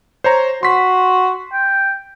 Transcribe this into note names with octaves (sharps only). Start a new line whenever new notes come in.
C5 C#5 A#5
F#4 C6 B6
G5